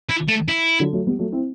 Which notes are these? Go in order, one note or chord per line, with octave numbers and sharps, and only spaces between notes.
E4
A3
E4
D3 F#3
F#3 A3
G3 B3
F#3 A3
C4 E4